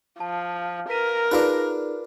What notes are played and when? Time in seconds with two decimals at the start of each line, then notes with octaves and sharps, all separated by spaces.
0.20 F3 A5
0.89 A#4 B4 B6 D#7
1.31 D4 D#4 F4 G#4 B4 D5